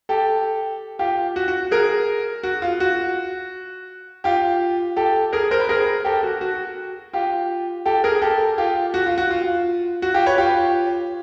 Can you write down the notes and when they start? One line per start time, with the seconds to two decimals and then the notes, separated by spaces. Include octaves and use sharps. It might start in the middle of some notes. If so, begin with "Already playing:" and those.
0.09 G4 A4
0.99 F4 G4
1.36 F#4
1.48 F#4
1.71 G#4 A#4
2.43 F#4
2.62 F4
2.80 F#4
4.24 F4 G4
4.96 G4 A4
5.33 G#4 A#4
5.51 A#4 C5
5.60 B4
5.69 G#4 A#4
6.05 G4 A4
6.23 F#4
6.41 F#4
7.13 F4 G4
7.86 G4 A4
8.04 G#4 A#4
8.22 G4 A4
8.58 F4 G4
8.94 F#4
9.06 F4
9.18 F#4
9.31 F4
10.02 F#4
10.14 F4 G4
10.26 B4 C#5
10.38 F4 G4